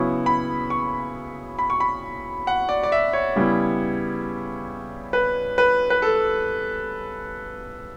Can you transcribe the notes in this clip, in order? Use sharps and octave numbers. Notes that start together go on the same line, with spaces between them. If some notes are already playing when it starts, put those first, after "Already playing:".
Already playing: C#3 F#3 B3 E4 C#6
B5
C#6
B5
C#6
B5
F#5
D5
D5
E5
C#5
C#3 G3 B3 E4
B4
B4
B4
A4